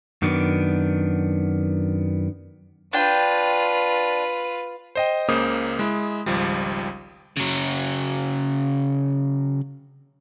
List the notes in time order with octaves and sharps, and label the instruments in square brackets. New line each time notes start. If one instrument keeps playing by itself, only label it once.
[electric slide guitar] F#2 D#3 B3 D4
[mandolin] D4 G5 [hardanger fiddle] F4 B4
[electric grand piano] C5 D#5 G5
C#2 C#3 A#3 C5 D6 D#6
G#3 E4
G#1 C#2 F3 G3
[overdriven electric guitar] C#3 F#3